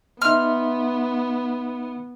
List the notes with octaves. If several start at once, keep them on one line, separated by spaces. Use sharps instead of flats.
B3 D#4 E5 C6 F6